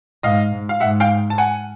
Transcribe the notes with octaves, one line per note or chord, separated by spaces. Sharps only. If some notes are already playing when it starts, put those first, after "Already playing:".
G#2 D#5 F5
G#2
F5
G#2 E5 F#5
F5 G5
A5
F#5 G#5